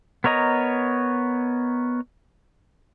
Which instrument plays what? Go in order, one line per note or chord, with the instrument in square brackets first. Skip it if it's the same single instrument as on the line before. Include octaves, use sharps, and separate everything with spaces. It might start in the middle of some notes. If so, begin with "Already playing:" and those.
[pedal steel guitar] B3 A#4 C#5 D#5 A#5